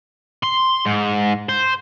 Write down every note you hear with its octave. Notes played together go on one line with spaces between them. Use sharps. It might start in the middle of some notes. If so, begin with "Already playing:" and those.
C6
G#2
C5